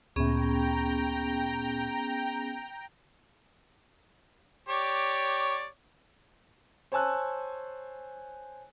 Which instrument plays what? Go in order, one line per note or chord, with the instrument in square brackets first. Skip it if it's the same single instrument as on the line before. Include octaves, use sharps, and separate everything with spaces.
[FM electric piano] D2 A#2 [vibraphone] B3 C#4 G#4 [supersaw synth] G5 A#5
[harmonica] G4 C#5 D5
[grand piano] C5 C#5 G#5 A5 E6 F#6